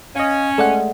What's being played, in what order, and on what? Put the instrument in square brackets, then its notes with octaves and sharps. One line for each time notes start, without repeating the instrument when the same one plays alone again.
[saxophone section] C#4 [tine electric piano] D#5 F5
[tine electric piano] G#3 A3 [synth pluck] A4 D5 F#5